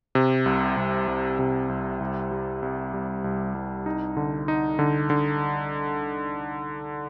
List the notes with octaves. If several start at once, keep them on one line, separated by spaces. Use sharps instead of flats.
C3
C2
C2
C2
C3
C2
C2
G3
C2
G3
C2
C2
D#4
D3
D#4
D3
D3